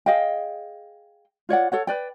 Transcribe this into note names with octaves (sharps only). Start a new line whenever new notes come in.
G#4 D#5 F5 G5
F4 C#5 D5 F#5
A4 C#5 F#5
B4 D5 G5